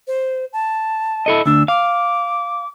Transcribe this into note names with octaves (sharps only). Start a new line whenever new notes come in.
C5
A5
E4 A4 D#5
D2 D4 E6
F5 D6